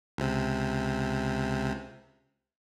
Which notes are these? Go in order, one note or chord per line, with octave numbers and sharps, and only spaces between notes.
C#2 C3